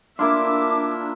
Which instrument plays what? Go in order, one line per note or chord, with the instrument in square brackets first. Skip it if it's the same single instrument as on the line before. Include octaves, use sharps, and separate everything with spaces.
[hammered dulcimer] A#3 E4 F4 [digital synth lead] D4 [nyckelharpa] E5 [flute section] D6